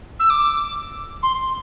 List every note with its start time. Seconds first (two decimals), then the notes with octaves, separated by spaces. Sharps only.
0.19 E6
0.30 D6
1.23 C6